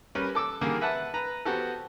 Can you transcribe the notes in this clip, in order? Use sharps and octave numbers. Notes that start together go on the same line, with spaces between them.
G3 C#4 A#4 B4
A4 D6 E6
D3 D#3 G3 A#3 G#4 A#4
B4 E5 F#5 A5
B4 A#5
B3 C4 F#4 G4 A4